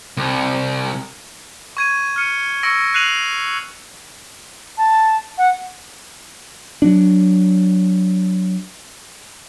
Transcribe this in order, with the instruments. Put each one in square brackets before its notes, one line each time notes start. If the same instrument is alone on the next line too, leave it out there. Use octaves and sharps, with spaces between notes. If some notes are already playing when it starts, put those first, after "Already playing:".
[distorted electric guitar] C2
[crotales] C#6 G#6 D#7
F6 C#7 D#7
C#6 E6 A#6 C#7 D7
F#6 C7 D#7 F7 F#7
[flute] A5
F#5
[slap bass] F#3 D4